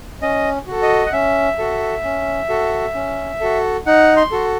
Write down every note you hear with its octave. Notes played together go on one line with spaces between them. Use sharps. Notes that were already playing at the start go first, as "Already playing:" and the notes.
C#4 D#5
F#4 A4
D#5
F#5
C#4 E5
F#4 A4
C#4
F#4 A4
C#4
F#4 A4
D#4 F#5
C6
F#4 A4